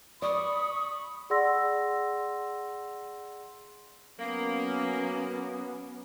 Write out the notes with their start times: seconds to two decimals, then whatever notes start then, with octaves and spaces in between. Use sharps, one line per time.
0.22 D5 B5 C#6 D#6
1.30 G#4 D5 F#5 C6 E6 A#6
4.19 F#3 A#3 B3 C#4